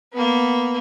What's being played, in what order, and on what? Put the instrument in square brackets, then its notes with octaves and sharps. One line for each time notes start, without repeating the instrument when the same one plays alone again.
[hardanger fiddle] A#3 B3